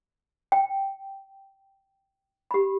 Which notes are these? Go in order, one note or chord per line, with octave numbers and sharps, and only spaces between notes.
G5
G4 B5